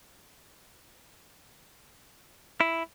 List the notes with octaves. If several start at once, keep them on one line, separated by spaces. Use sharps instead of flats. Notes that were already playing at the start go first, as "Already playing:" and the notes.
E4